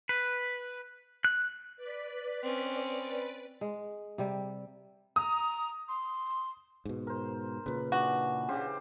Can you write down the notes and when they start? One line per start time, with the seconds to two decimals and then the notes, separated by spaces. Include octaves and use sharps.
0.09 B4
1.25 F#6
1.76 B4 D5 B5
2.42 C4 C#4
3.61 G#3
4.18 C3 G3
5.16 A#5 D#6
5.88 C6
6.85 G#2 B2
7.07 A#4 C5
7.66 A#2 C#3 B4
7.92 E3 D4 F#4
8.48 C#3 G4 C5